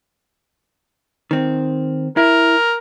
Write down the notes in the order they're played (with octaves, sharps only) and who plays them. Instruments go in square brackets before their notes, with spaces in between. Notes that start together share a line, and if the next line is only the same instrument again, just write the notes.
[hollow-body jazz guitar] D#3 C4
[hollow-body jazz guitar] E4 [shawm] A#4